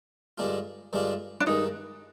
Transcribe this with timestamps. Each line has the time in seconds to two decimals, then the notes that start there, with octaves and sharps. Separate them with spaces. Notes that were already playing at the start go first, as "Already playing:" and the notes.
0.38 G2 D3 G#3 D4 F4
0.93 G2 D3 G#3 D4 F4
1.40 D4
1.46 G2 D#3 G#3 D#4